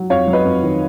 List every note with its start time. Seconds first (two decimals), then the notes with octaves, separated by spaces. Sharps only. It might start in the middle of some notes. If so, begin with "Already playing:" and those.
Already playing: F#3
0.10 F2 C#5 F5
0.27 F#3
0.33 B4 D#5
0.45 F2
0.63 D#3